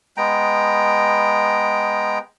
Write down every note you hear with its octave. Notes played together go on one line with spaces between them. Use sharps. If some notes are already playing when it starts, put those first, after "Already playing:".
G#3 B3 G5 A#5